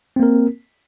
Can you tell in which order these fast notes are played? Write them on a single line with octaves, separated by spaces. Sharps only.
C4 A#3 A#4